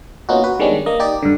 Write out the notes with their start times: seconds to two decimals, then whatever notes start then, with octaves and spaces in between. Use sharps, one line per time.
0.29 A#3 B3 C#4 D#4 F4 F#4
0.44 F#4 B4
0.60 D#3 G3 G#3 B3 C#4 D4
0.86 A#3 D#5
1.00 D#4 G4 D5
1.22 G2 D3